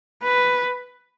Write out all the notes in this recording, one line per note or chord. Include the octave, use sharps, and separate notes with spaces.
B4